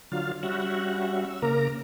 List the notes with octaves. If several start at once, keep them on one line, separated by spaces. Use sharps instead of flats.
D3 F#3 F4 F5
G3 C#4 F#4 E5 F#5
E6
C#3 A#3 A#4 A#5